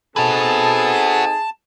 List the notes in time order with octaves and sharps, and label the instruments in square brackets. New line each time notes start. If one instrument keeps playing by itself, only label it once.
[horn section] C4 D#4 A4 [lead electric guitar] F#4 B4 [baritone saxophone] G#4 [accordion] A5